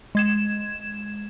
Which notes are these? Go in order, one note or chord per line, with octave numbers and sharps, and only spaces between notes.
G#3 G#6 E7